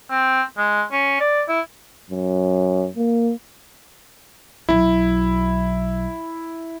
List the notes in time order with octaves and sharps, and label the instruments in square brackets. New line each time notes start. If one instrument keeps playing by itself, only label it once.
[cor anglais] C4
G#3
C#4
D5
E4
[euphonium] F#2
A#3
[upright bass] B1 F#3 [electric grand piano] E4